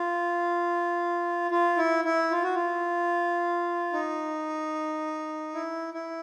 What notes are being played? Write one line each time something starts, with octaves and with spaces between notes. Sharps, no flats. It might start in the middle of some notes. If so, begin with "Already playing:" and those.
Already playing: F4
F4
E4
E4
F4
F#4
F4
D#4
E4
E4